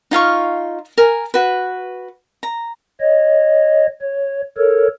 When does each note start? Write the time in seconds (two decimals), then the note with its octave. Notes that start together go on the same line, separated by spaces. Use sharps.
0.11 D#4 F4 F5 C#6
0.98 A#4 G#5
1.34 F#4 B4
2.43 A#5
3.00 C#5 D#5
4.01 C#5
4.57 A4 A#4 C#5